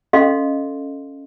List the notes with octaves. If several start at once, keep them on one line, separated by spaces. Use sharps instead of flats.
C#4 A4 D#5 F5 C6